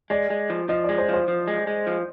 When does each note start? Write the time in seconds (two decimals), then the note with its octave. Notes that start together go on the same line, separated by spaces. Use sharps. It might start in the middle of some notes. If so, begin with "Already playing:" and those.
0.10 G#3 D5
0.30 G#3
0.50 F3
0.69 F3 D#5
0.84 D5
0.89 G#3
0.98 C5
1.09 F3 C5
1.28 F3
1.48 G#3
1.67 G#3
1.87 F3